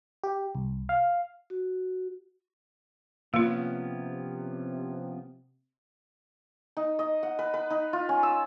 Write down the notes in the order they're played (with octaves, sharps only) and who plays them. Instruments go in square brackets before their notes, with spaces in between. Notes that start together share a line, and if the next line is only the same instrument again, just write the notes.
[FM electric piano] G4
C2
F5
[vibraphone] F#4
[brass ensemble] C3 [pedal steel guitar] F3 B3 C#4 [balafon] A#3 F4
[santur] D#4
D#5
F#5
B4
B4
D#4
F4
C#4
E6